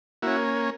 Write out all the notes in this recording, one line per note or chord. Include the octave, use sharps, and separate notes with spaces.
A#3 C#4 E4 F#4